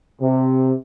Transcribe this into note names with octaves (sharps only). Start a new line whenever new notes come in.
C3